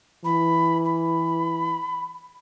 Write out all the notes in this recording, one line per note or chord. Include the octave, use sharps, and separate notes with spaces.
E3 B5
B5